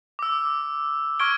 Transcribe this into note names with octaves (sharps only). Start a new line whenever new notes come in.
D6 E6
C#6 F6 G#6 D7 G7